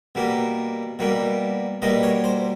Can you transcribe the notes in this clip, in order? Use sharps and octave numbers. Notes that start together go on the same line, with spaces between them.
B2 G3 A#3
B2 G3 A#3
B2 G3 A#3 D#5
C#5
C5